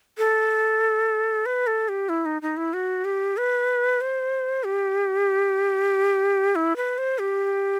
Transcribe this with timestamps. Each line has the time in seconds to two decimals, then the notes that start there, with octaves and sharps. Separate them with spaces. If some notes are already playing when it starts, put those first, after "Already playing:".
0.18 A4
1.46 B4
1.67 A4
1.89 G4
2.09 E4
2.26 D#4
2.42 D#4
2.57 E4
2.73 F#4
3.05 G4
3.37 B4
4.01 C5
4.64 G4
6.55 E4
6.76 B4
6.98 C5
7.19 G4